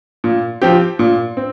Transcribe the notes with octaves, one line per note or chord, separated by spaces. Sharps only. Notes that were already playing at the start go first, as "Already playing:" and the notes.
A#2
F3 C4 G4
A#2
C4